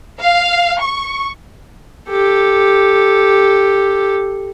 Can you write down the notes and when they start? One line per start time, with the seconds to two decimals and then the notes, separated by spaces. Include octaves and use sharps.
0.22 F5
0.81 C#6
2.09 G4 A4